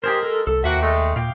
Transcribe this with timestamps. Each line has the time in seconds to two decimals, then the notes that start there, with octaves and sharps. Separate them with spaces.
0.04 G#3 G4 G#4 A#4 C5
0.23 A4 E6
0.47 C2 A4
0.64 D#2 F3 A#3 F#4 E5 G5
0.82 G#3 A3
1.16 A#2 F5 G5 D6